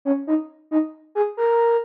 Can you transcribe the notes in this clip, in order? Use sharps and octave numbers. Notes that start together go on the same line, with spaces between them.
C#4
D#4
D#4
G#4
A#4